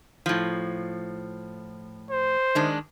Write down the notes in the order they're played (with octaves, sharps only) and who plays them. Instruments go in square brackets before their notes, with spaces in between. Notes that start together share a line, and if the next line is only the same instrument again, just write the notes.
[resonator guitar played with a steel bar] A2 F3
[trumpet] C5
[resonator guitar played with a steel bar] D#3 G#3 D4